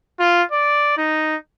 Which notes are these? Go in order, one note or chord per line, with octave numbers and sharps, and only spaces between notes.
F4
D5
D#4